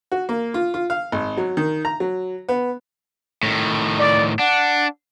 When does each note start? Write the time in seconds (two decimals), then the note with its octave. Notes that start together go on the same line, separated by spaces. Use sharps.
0.12 F#4
0.29 A#3
0.54 F4
0.74 F4
0.90 F5
1.12 G#1
1.37 F#3
1.57 D#3
1.85 A#5
2.00 F#3
2.49 B3
3.43 A2 D#3
3.99 D5
4.39 D4 F#5